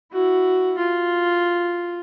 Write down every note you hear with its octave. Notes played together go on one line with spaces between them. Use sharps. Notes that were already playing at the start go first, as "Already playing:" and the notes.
E4 F#4
F4